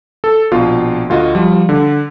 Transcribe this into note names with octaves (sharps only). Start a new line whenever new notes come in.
A4
A#1 B2 F4
D2 F4 F#4 D#5
F3 G3
D3